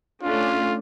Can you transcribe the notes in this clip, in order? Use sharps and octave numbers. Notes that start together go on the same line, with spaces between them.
A3 C#4 D4 F4